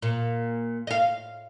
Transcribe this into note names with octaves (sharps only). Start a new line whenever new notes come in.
A#2
D#5 F5